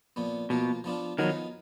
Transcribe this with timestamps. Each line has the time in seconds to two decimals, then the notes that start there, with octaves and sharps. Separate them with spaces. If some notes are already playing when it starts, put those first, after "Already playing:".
0.16 A#2 F3 B3
0.50 B2 F3 A#3 F4
0.84 F3 B3 D4 F4
1.18 D#3 F3 F#3 B3 D#4